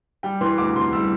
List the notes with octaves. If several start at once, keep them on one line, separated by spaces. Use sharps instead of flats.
G3 G5
E3 C6
D2 D6
C3 C6
G3 E6